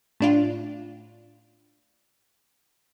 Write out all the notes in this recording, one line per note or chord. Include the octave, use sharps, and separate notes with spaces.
A2 D4 F4